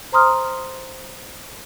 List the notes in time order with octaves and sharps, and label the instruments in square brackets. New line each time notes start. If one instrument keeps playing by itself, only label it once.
[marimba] C5 A#5 C6 D#6 F6